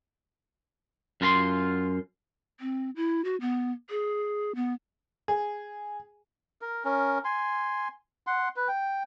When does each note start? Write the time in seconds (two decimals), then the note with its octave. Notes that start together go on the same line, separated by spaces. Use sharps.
1.21 F#2 F4 A#5 C6
2.60 C4
2.96 E4
3.24 F#4
3.41 B3
3.90 G#4
4.55 B3
5.28 G#4
6.62 A#4
6.85 C#4 A#4
7.25 G#5 C6
8.27 F#5 C6
8.56 B4
8.68 G5